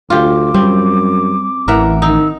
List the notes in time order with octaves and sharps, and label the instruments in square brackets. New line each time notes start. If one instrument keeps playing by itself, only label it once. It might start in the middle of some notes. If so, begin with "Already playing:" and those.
[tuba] D2 [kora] F4 G4 [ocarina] D6
[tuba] F#2 [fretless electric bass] G3 [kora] C4
[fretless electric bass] A1 [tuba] E3 [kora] A#4 E5 F#5
[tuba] D#3 [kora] D#4 [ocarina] E6